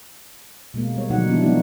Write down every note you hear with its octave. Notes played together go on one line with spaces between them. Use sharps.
B2 G#3 A#3
G3 C#5
B2 D3 F3 F#3 D#4 F#5
E3 F3 B3 D4 E4
F#3 G#3 A#3 B3 D#4 F#4